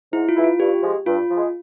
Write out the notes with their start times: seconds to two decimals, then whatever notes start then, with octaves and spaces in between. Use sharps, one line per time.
0.13 G#2 E4
0.29 F4
0.36 E3 G#3 E4
0.44 F4
0.59 G2 G4
0.83 F3 G#3
1.06 G2 F4
1.31 F3 G#3